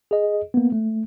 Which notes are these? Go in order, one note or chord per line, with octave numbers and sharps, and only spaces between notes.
G#4 D#5
A#3 B3
A3